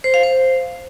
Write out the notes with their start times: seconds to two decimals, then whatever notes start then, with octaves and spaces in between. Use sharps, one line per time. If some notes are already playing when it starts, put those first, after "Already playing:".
0.04 C5
0.14 F5
0.23 C5